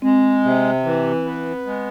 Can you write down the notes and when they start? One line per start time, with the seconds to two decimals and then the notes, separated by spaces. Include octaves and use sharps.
0.02 G#3 C4
0.44 C3
0.85 E3
1.25 B3
1.67 G#3